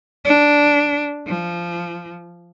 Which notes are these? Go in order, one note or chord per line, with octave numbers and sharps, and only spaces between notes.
D4
F3